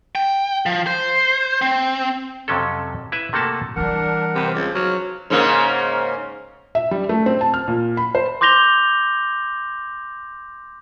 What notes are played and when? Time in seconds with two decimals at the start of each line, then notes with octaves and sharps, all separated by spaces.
0.15 G5
0.66 F3
0.87 C5
1.62 C4
2.48 F2 C3 F#3 C#4 A4
3.12 E4 B4 E5
3.33 C3 A3 A#3 F#4 A4 A5
3.76 E3 G3 D4 A#4 F#5
4.35 C3 G4 B4 C5
4.54 C#2 F3 D6
4.75 F#3 F6
5.30 G#2 C#3 A#3
6.75 E5
6.91 G3
7.09 A3
7.26 C4
7.41 A5
7.54 F6
7.68 A#2
7.97 B5
8.15 C5
8.41 C6 D6 G6 A#6 F7 G7